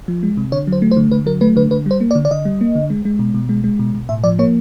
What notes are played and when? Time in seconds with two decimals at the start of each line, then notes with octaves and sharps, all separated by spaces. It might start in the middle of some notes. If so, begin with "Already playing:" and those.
0.08 F3
0.23 G#3
0.37 C3
0.52 D3 C#5
0.67 F#3
0.72 C5
0.82 A3
0.91 C5
0.97 D3
1.11 D3 B4
1.26 F#3 A#4
1.41 A3 B4
1.56 D3 B4
1.71 D3 B4
1.86 G3 C5
2.01 A#3
2.11 D5
2.15 D3
2.25 D5
2.31 D3 D#5
2.45 G3
2.61 A#3
2.75 D3
2.90 G#3
3.05 G#3
3.19 B2
3.34 B2
3.49 G#3
3.64 G#3
3.79 B2
3.94 B2
4.09 A2 E5
4.24 F3 D5
4.39 A#3 C#5